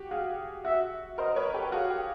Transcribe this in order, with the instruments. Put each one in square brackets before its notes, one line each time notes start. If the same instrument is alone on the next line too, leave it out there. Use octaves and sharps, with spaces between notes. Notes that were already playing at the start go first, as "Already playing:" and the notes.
Already playing: [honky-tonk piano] F#4 G4
[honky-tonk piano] F#4 G#4 [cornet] F5
[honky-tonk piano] F#4 [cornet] E5
[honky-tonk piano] A#4 C5 [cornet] D#5
[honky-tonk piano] B4 C#5
G4 A4
[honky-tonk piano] F#4 G#4 [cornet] F5
[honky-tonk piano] G4